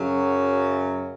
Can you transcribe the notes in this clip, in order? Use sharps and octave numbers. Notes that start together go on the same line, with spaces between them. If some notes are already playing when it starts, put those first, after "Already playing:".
Already playing: F#2 C#3 F#3